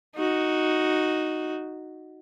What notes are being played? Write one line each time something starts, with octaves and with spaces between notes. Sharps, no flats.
D#4 F#4